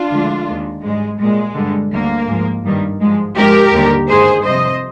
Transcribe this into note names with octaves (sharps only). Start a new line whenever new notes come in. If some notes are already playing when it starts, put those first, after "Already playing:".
Already playing: D4 F4
D2 D3 F3 G#3
D#2 D#3 G#3
G#2 G3 G#3
A#2 G3 G#3
G2 D3 G3
D2 D3 G3 A#3
G#2 F3 G#3
G2 D#3 G3
G#2 F3 G#3
G#2 F3 G#3 G4 A#4
D#2 D3 G3
G2 D#3 G#3 G#4 C5
F2 C3 G3 C5 D#5